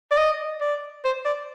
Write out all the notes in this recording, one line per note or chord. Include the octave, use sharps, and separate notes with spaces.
D5
D#5
D5
C5
D5